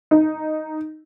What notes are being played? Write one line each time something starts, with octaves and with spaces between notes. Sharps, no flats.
D#4